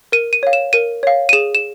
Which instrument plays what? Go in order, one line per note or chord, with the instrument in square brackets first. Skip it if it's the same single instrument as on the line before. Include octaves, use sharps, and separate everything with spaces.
[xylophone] A#4 D#7
D#7
C#5 F5
E7
A#4 D#7
C#5 F5
D#7
G#4 E7
E7